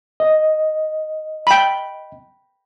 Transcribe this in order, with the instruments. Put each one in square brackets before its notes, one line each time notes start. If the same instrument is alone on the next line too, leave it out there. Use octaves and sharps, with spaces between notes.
[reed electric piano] D#5
[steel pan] G5 B5